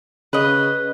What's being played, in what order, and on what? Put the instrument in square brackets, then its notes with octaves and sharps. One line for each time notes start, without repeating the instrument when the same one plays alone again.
[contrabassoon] C#3 [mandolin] B4 D#5